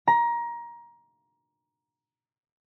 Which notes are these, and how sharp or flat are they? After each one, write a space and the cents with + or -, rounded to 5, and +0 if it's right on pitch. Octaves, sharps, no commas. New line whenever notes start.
A#5 +20